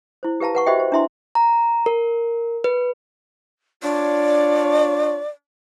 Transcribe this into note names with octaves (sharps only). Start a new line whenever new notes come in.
E4 C5
G4 B4 F5 A5 A#5
B4 F#5 C#6
F#4 G4 C5 D#5 E5 G5
C5
D4 E4 E5 A#5 C6
A#5
A#4
B4
D4 F4 C#5 D5